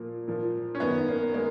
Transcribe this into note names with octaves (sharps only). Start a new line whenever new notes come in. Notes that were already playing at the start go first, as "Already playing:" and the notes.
Already playing: A#2 F3 A#3
A#2 F3 A#3
C#4
F#2 D#3 A#3 B3
A#3
G#3 A#3